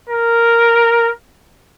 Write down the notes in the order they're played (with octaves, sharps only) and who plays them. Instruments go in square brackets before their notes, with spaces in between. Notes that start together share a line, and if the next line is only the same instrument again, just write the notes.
[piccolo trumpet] A#4